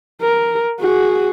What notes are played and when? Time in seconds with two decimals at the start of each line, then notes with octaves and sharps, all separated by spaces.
0.21 A#4
0.80 F#4 G#4